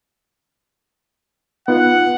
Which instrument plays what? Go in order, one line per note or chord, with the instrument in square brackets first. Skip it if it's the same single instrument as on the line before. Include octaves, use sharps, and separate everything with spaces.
[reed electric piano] B3 D#4 F4 [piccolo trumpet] F#5